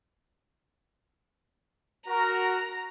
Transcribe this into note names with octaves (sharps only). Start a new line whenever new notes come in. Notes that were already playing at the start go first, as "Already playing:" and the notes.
F#4 A#4 A#5